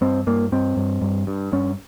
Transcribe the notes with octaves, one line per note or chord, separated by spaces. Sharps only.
G2 C4
G2 A#3
G2 C4
G2
G2
G2
G2 C#4